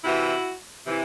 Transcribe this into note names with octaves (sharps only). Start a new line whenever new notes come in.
C3 E3 E4 F#4
C3 E3